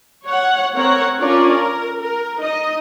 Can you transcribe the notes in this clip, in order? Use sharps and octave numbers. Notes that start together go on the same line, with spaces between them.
C#5 F#5
C4 A#4 C#5 F#5
C#4 D4 F4 A#4 C#5 D5
A#4
A#4
D#4 D#5